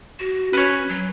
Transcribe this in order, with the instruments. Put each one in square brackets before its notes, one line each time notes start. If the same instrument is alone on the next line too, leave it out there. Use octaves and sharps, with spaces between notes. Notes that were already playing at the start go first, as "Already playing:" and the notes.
[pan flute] F#4
[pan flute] C#4 [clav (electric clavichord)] B4 C#5
[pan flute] F#3